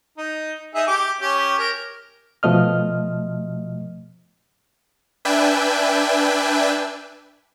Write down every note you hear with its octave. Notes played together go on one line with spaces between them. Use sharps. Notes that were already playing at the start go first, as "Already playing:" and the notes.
D#4
D#4 G#4 E5
G4 D6
C#4 G4
A#4
B2 F3 A3 D#5 F6
D4 B4 E5 G5 G#5